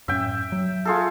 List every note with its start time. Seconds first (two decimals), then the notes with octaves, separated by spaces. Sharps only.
0.08 F#2 A2 C#4 E5 G5
0.52 F#3
0.85 F4 G#4 A4